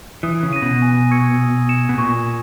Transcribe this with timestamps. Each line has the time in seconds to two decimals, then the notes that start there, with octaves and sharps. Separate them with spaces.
0.23 E3 D#6
0.43 C#3
0.53 A#6 D#7
0.62 B2
0.82 G#5
1.11 C#6 E6 G#6 C#7
1.40 D#6
1.69 G#6 C#7 E7
1.89 B2
1.98 A#2 C#6
2.27 E7